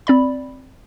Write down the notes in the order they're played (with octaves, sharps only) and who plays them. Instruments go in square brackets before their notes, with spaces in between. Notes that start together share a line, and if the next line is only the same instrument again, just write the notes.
[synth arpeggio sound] C4 D5 B5